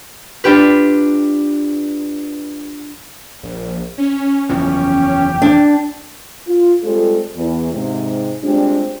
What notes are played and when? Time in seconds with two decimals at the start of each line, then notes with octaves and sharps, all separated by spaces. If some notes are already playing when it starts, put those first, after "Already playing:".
0.44 D4 F4 G4 B4
3.43 A#1
3.98 C#4
4.49 F#1 E2 F3 G4
5.42 D4
6.47 F4
6.83 G3 G#3 C4 F4 A4
7.35 E2
7.71 G#2 C3
8.43 G3 G#3 C4 D4 F4 G4